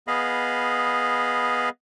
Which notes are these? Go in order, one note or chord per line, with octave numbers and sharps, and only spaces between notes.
B3 G#4 D#5 F5 B5